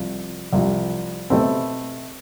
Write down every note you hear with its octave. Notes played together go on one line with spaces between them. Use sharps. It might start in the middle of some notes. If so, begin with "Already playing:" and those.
Already playing: C2 C3 F3
C2 C3 F3
B2 A3 C4 E4